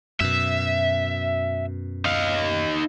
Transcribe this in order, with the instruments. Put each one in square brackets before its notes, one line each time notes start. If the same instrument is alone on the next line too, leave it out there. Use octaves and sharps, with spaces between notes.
[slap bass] F#2 B2 [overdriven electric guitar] E5
[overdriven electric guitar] D#4 F5